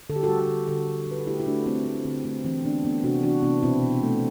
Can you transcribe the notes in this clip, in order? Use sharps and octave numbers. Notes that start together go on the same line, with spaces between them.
D3 A4
G4
G3 F#4 A4
F#4 A4
D3
D3 F#4 A4
D3
D3 B4
A4
A3 E4 G4
E4
A3 D4 F#4
A3 C4 E4
A3 C4
D3 C4
A3 C4
E3 C4
A3 B3 D4
A3 B3 D4
C3 D4 F#4
E3 D4 F#4
C3 B3 D4
B2 C4 E4
B2
A3